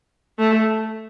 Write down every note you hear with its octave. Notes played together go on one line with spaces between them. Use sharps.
A3